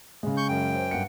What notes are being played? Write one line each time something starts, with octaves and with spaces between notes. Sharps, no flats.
C#3 G#3
C#6 G6
F#2 G5
C5
G2 F#5 C#7